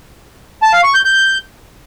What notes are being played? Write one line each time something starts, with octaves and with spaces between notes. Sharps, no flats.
A5
F5
C#6
G6
G6